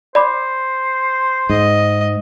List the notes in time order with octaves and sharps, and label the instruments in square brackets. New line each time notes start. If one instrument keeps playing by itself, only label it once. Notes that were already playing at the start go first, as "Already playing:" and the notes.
[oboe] C5 [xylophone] D5 B5 D6
[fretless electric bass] G#2 [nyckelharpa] D#5